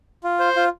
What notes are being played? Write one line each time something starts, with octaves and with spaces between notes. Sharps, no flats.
F4
C5
F4